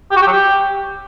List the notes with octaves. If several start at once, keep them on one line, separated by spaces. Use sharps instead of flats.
G4
F#4
G4
F#3
G4